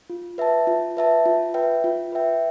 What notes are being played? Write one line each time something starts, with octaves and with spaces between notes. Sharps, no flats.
F4
B4 E5 A5
F4
B4 E5 A5
F4
B4 E5 G5
F4
B4 E5 G5